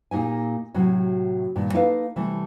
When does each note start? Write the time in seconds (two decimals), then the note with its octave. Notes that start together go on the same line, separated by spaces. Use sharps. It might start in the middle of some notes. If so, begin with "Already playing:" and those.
0.11 A#2 A#3 D#4 G4 G#5
0.74 A2 C3 F#3 F#4
1.56 G2 A#2 D#3
1.74 A#3 D#4 E4 A4 B4 F5
2.16 C3 E3 G3 A3